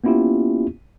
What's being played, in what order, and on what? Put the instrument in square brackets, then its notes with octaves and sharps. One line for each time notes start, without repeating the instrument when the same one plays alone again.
[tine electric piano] A#3 B3 C#4 E4 F4 G4